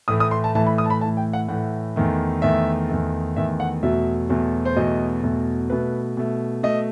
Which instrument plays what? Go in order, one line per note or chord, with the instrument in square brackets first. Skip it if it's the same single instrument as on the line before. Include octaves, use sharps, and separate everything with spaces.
[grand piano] A2 E3 A3 D#6
D#6
C6
A5
A2 E3 A3 A5
B5
D#6
A5
B5
A2 E3 A3 A5
G5
F#5
A2 E3 A3 F#5
E2 D#3 A3
E2 D#3 A3 E5
E2 D#3 A3
E2 D#3 A3 E5
F#5
E2 B2 F#3 A3 E5
E2 B2 F#3 A3
C5
E2 B2 F#3 A3 D#5
E2 B2 F#3 A3
B2 A3 B4
B2 A3
B2 A3 D#5